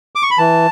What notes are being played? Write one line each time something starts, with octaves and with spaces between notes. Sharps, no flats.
D6
C#6
B5
E3 A5